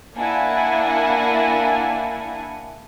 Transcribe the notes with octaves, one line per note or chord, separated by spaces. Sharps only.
A#3 D4 E4 F#5 G#5